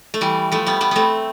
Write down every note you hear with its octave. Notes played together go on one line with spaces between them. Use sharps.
A3
E3 G3
F3 A3
G3 B3
G3 B3
A3 B3 C4